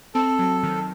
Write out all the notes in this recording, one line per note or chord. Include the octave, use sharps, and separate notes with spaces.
C4 A4
F#3
D#3